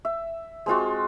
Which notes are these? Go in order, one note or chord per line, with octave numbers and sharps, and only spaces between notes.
E5
G#3 C4 F4 F#4